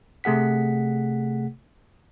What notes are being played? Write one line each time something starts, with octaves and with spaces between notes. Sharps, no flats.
C3 A3 G#4 F#5 B6